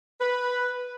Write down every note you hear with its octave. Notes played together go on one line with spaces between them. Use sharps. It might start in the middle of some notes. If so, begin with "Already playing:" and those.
B4